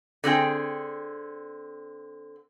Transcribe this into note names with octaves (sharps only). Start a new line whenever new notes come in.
D3 C4 G#4 G5